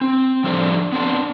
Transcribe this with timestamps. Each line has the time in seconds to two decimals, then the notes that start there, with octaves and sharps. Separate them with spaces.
0.01 C4
0.44 F3 G3 D4 A4 C5 D5
0.92 B3 C4 D4